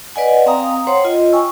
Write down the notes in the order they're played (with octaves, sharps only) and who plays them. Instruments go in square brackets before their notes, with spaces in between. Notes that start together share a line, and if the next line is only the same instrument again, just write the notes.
[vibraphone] B4 D5 D#5 F#5 G#5
C4 F5 G5 A#5 D#6
C5 C#5 F#5 C6
F4 D#5
G5 G#5 C#6 E6